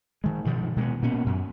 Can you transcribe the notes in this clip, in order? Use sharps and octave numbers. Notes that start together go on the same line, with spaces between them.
D#3 G#3
G2 B2 D#3 F3
B2 G#3 A#3 B3
A#2 A#3 B3 C#4
F#2